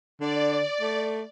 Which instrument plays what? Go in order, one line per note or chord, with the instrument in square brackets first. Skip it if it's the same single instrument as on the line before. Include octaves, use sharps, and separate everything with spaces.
[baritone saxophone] D3 [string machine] D5
[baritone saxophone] A3